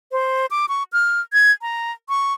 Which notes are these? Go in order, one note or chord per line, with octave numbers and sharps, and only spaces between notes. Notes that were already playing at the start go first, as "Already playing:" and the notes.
C5
D6
C#6
F6
G#6
A#5
C#6